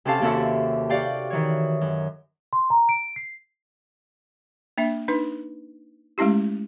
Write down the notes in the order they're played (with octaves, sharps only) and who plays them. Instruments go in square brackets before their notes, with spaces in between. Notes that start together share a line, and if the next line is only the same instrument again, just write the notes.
[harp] C3 C#4 G4 A4 F5 A5
D#2 C3 C#4 F#4 A4 E5
F#4 G4 D5 F5 G5
D#3 E3 C#5
F#2
[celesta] C6
A#5
D7
C7
[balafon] A#3 D4 E5
D4 D#4 B4
G#3 A3 C#4 E4 G4